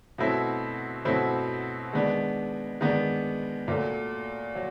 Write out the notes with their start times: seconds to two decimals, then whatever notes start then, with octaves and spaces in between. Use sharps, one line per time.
0.18 B2 F#3 A3 C4 E4
1.05 B2 F#3 A3 C4 E4
1.93 D#3 G#3 B3 D4
2.81 D#3 G#3 B3 D4
3.68 A#2 F#3 A3
4.55 F#3